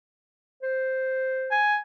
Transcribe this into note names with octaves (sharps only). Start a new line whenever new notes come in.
C5
G#5